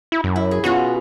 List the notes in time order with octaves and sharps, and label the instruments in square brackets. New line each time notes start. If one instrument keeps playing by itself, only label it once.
[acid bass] E4
F#2
[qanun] E4
G#4
[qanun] B2 C#4 F4 [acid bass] F#4